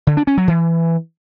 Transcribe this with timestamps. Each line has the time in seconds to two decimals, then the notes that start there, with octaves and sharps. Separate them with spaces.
0.07 D3
0.17 D4
0.27 C#4
0.37 F#3
0.48 E3